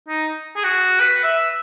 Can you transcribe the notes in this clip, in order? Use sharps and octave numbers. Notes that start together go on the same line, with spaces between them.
D#4
G#4
F#4
B4
E5